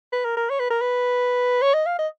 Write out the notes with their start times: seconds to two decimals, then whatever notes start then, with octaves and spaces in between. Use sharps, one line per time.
0.13 B4
0.25 A#4
0.37 A#4
0.50 C#5
0.60 B4
0.70 A#4
0.81 B4
1.62 C#5
1.74 D#5
1.86 F5
1.99 D#5